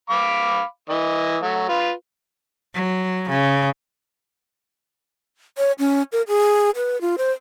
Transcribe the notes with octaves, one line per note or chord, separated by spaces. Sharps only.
F5 B5 D6
E3 D#5
F#3 A3
F4 B4
F#3
C#3
C#5
C#4
A#4
G#4
B4
F4
C5